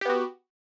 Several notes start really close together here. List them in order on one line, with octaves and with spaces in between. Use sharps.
G4 B3 F#4